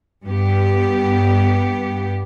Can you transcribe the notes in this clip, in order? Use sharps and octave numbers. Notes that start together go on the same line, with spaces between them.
G2 B3 G4